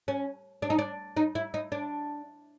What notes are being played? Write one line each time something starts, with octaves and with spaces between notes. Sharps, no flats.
C#4
D4
D#4
D4
D#4
E4
D#4
D4